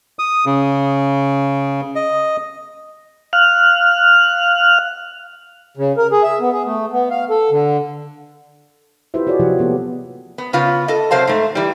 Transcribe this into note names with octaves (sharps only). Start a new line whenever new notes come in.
D#6
C#3
D#5
F5 F6 F#6
C#3
A#4
G#4
E5
B3
G#4
A3
B3
F5
A4
D3
E4 F4 G4 B4 C5 E5
F#4 G#4 C#5 D5
C3 F3 F#3 F4 G4 F#5
F3 A#3 B3 G4 A4
B3
C#3 B3 F4
A4 D#5
C3 F#3 C5 F5 A5
G#2 A3
E3 G3